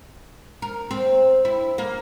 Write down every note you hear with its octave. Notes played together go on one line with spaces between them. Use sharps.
A#4
C4
E4
A#3